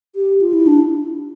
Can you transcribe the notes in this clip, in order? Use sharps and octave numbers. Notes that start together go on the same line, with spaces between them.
G4
F4
E4
D4